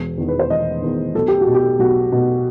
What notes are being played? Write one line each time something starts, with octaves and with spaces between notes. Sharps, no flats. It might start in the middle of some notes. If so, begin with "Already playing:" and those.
Already playing: E1
E2 D#3
B4
C5
E1 D#5
E2 D#3
B1 A4
G4
F#4
B2
G4
B1 F#4
B2